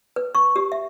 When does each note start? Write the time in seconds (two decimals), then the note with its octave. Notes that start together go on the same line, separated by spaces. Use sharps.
0.16 B4
0.35 C#6
0.56 G4
0.72 E5